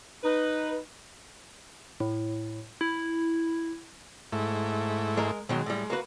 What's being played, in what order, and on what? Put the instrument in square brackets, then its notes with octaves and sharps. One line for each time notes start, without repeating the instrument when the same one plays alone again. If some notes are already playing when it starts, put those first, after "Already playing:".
[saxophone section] D#4 B4
[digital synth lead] A2
E4
[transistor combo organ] G#2 A3 E4
[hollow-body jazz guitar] G#3 A#4
[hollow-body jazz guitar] B2 D#3 F#3 [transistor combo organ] G#3
[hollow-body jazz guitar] A2 G3
A#3 F#4 B4